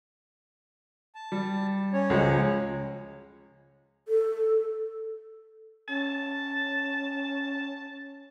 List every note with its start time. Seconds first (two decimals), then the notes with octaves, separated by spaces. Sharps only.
1.15 A5
1.32 G3
1.93 C#4 C#5
2.10 C#2 F3 G#3
4.08 A4
5.88 C#4 A5